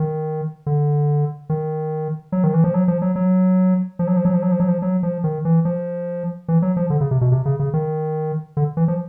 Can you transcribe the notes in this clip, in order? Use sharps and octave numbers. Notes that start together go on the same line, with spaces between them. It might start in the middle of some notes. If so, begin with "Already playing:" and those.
Already playing: D#3
D3
D#3
F#3
D#3
E3
F3
F#3
F3
F#3
F#3
F3
F#3
F3
F#3
F3
F#3
F3
F#3
F3
F#3
F3
D#3
E3
F3
E3
F#3
F3
D3
C#3
C3
B2
C3
C#3
C#3
D#3
D3
E3
F3